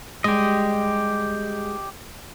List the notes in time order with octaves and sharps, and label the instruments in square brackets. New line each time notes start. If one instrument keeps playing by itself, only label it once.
[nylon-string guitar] G3 G#3 [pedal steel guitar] G4 D#5